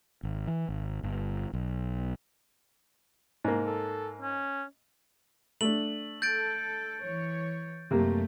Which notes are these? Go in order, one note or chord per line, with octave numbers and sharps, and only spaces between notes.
G#1
E3
G#1
G1
B1
G#2 A#3
A4
C#4
A3 D4 F#7
A4 G6 A6 D7
E3 C#5
F#2 C3 A3 A#3